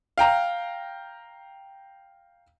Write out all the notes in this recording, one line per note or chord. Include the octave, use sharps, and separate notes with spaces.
F5 G5 A#5